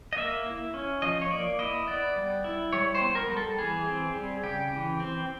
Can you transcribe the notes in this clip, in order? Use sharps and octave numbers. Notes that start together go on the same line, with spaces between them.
D#5
A#3 E5
E4
C#4
F3 D#5
C#5
A#3 D5
E4 D#5
B3 D5
G3
E4
G3 C#5
C5
B3
A#4
G3
A4
E3 G#4
C4
G3
C#3 G4
E3
C4